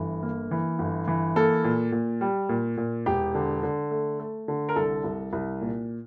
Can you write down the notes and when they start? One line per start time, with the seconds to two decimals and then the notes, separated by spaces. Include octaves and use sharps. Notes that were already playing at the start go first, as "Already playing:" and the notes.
Already playing: G1 E3
0.23 A#3
0.51 E3
0.79 G1
1.08 E3
1.36 A#3 A4
1.64 A#2
1.92 A#2
2.21 G3
2.49 A#2
2.77 A#2
3.06 E1 G4
3.35 D3
3.63 D3
3.91 A3
4.19 A3
4.48 D3
4.69 A#4
4.76 C2 A4
5.04 C2
5.33 C2
5.61 A#2